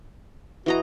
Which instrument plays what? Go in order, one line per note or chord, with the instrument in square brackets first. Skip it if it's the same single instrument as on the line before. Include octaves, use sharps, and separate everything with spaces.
[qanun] E3 D#5 A#5 [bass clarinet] F#4